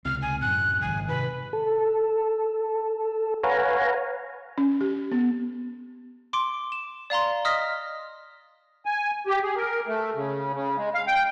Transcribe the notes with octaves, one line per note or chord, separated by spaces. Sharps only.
C#2 C3 C4 F6
G#5
F#2 A2 F#6
G#1 C#3 G#5
C3 D#3 B4
A4
B4 C#5 F5 F#5 G#5 A#5
C#4
G4
B3
C6 D6 D7
E7
D5 F5 A#5 C6
D#5 D#6 F6 A#6 B6
G#5
G4
G#4
A#4
A3
C#3
C#3
G#3
F5
G5